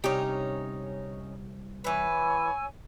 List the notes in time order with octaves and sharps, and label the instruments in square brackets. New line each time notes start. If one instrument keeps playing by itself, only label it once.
[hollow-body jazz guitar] C2 G4 [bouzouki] C#4 D#4
[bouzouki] E3 B4 [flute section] C#5 G#5 E6